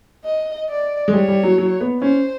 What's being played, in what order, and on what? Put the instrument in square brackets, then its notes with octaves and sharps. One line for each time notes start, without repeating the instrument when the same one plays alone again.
[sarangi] D#5
D5
[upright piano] G#3
[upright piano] G3 [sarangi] C#5
[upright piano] G3
F#3
F#3
B3
[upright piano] C#4 [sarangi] C5